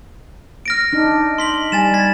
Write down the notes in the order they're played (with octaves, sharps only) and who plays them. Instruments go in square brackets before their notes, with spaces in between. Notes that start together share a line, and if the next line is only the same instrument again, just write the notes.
[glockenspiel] F6 A#6 D7
[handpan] D4 D#4
[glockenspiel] C6 B6 F#7
[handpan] G3 [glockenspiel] G#5 A6 E7
[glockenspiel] G#6 A6 B6